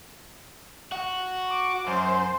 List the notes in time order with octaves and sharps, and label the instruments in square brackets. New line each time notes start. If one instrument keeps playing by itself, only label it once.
[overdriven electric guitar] F#4
[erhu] D6
[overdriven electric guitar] F#2 [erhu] C5